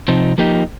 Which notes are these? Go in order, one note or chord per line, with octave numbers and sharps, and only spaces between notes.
C3 F3 C4 D#4
F3 A#3 D#4 G4